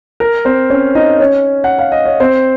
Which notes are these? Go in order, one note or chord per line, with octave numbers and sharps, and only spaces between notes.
A#4
C4 C5
C#4 C#5
D#4 D#5
C#4 C#5
F#5
F5
D#5
C#5
C4 C5